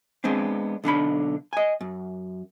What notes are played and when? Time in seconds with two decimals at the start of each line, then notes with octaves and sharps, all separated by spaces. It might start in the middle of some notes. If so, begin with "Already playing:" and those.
0.24 G#3 B3 C4 D4
0.84 B1 D3 D4 B5
1.53 D#5 G#5
1.81 F#2